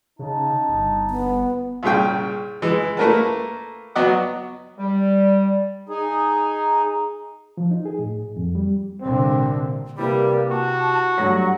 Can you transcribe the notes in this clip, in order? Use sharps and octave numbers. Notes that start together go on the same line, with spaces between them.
C#3 D#4 A5
G1
B3
C2 A#2 C#3 G5
E3 G#3
A3 A#3 A#4 B4 A5
F#3 B3 F#4 D5 D#5 F#5
G3
D#4 G#4
F3
D#4
G#4
A2
F2
G3
C2 A#2 D3 C4
C3 G3 A#3 E4 B4
F#4 A5
G2 F#3 A3 F#5 A#6